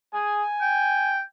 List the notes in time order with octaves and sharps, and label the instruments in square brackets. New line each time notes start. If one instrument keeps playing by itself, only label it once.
[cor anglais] G#4 [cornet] G#5
[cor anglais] G5